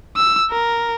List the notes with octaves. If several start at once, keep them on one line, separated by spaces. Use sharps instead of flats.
E6
A#4